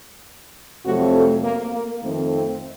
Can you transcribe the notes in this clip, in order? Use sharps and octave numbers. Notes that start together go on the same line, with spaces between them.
F2 C3 F#3 A3 F#4
A4
A#3
A#3
F2 D#3 A3 C4
C4